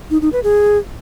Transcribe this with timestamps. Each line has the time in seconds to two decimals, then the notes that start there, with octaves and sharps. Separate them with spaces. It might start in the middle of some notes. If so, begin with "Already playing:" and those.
0.11 D#4
0.22 D#4
0.33 B4
0.44 G#4